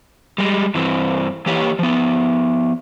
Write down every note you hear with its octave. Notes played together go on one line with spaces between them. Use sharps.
G3 G#3
G2 E3 C4
E3 A#3 G4 C#5
F3 B3